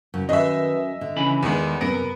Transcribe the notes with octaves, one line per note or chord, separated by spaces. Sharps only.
F#2 C#3
F#2 D#3 B4 D#5 E5
D3
C#3 E3 B5
E2 D#3 G#3 B3
F#2 C3 B3 A#4